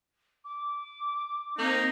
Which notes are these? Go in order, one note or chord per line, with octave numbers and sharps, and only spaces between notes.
D6
A#3 C4 D#4